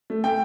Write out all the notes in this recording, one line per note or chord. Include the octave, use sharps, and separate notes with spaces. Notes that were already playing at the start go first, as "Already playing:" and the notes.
A3
A3 G5